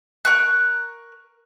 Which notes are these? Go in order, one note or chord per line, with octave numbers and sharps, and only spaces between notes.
A#4 C#6 F#6